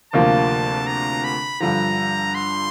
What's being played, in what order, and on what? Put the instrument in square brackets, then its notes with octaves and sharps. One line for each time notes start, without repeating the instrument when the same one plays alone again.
[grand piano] D2 C3 F3 A#3 [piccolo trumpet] A5
[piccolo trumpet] A#5
B5
[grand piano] G2 D3 F3 [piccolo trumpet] A#5
[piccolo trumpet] C6